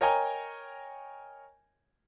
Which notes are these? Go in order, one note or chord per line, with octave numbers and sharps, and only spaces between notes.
A#4 C#5 D#5 G5 G#5 A#5